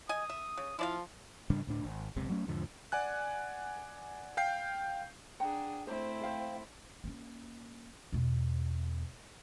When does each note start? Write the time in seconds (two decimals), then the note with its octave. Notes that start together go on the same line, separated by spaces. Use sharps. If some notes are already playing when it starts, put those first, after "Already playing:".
0.09 D#5 G#5 D#6
0.30 E5
0.57 C#3
0.79 F3 E4 D5 F5
1.50 G#2 C#3 G3 D4
1.67 D2 A2 D4
1.85 G#1
2.16 F#1 C#2 C3
2.30 F#3 A3 C#4
2.47 E2 G#2 D3 F3
2.92 D5 F#5 G#5 F#6
4.37 F5 G5 G6 C7
5.40 D4 G#4 F#5 G5 A#5
5.87 A3 C4 E4 C5
6.21 C5 F5 G5
7.04 A#3 C#4
8.12 E2 B2